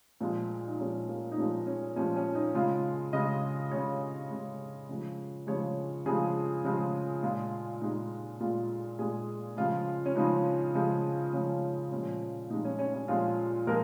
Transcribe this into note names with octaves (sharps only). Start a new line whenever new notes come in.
A#2 F3 G#3
D#4
A#2 F3 G#3 C#4
A#3
D#4
A#2 F3 G#3 C#4
C#4
A#2 F3 G#3 C#4
C#4
D#4
C#3 G#3 F4
C#3 G#3 D#5
C#3 G#3 C#5
C#3 G#3
C#3 F3 G#3
C#3 F3 G#3 C#5
C#3 F3 G#3 G#4
C#3 F3 G#3
A#2 G#3 F4
A#2 G#3 D#4
A#2 G#3 F4
A#2 G#3 G#4
C#3 F3 G#3 F4
C#4
C#3 F3 G#3 D#4
C#3 F3 G#3
C#3 F3 G#3 C#4
A#2 F3 G#3 C#4
A#2 F3 G#3 D#4
C#4
C#4
C#4
A#2 F3 G#3 F4
A#2 F3 G#3 A#4